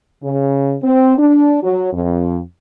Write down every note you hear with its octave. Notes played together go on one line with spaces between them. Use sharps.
C#3
C4
D4
F#3
F2